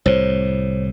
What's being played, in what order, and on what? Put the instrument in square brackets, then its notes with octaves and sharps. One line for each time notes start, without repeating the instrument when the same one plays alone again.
[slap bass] C2 A2 [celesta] C5 C#5